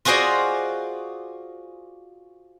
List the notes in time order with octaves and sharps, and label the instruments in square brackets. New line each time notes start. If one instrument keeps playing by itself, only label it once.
[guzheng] F4 F#4 G#4 C5 D5 D#5